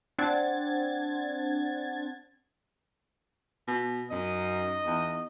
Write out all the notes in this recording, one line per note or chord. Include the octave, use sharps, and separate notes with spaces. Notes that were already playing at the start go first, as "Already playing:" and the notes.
C4 D4 F#5 G#6 A6
B2
F#2 D#4 D#5
E2